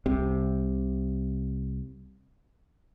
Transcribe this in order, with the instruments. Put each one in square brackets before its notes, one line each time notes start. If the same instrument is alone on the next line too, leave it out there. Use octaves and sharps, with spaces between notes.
[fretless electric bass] C2 C3